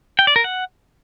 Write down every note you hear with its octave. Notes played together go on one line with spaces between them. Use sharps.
G5
D5
A#4
F#5